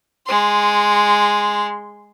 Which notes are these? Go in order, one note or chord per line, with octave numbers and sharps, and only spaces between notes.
G#3 C6